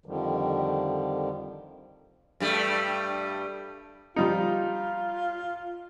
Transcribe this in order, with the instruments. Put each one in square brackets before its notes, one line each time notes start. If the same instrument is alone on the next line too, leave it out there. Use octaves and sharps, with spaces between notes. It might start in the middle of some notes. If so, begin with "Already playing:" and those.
[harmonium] F2 D3 D#3 F3 G3
[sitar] G2 G3 A3
[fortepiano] F3 G3 D#4 [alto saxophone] F4